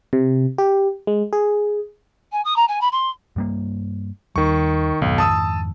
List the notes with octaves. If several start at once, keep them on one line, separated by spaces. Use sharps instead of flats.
C3
G4
G#3
G#4
G#5
D#6
A#5
G#5
B5
C6
G2 G3 A#3
D#2 D#3 G3 C#6
B1 F2 G#2 D#3
A5 D#6 E6